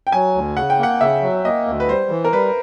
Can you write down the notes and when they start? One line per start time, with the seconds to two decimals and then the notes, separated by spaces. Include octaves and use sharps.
0.07 G5
0.12 F#3 G#5
0.34 D2
0.56 C#3 F#5
0.70 G5
0.79 A#3 F#5
1.01 C#3 E5
1.22 F#3
1.45 A#3 D#5
1.67 D2
1.80 B4
1.88 G3 C5
2.10 E3
2.25 A#4
2.33 G3 B4